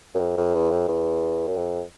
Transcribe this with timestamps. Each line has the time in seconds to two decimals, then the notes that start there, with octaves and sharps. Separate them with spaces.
0.15 F#2
0.20 F2
0.37 F2
0.55 E2
0.71 F2
0.88 E2
1.48 F#2
1.57 F2